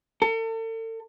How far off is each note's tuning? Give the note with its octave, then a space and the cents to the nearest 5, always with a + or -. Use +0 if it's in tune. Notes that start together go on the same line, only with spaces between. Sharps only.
A4 +40